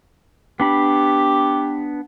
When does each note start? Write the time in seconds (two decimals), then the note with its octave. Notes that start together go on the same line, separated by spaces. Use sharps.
0.60 B3 D4 G4 B5